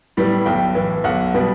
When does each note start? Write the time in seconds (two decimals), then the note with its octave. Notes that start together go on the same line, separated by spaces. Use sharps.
0.17 A2 G3 B3
0.46 B1 G5
0.75 A2 E3 B3
1.04 B1 F#5
1.34 B2 G3 B3